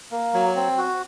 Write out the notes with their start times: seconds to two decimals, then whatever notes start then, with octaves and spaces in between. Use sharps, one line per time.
0.12 A#3
0.34 F#3
0.56 C4
0.78 F#4